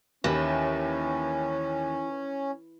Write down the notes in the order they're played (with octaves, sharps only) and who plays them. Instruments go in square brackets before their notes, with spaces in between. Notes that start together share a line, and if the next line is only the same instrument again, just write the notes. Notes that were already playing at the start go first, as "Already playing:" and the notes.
[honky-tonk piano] D#2 [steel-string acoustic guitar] E3 [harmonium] C#4